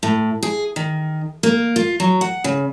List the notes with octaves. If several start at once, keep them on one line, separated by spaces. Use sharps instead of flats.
A2
G#4
D#3
A#3
F4
F#3
F#5
C#3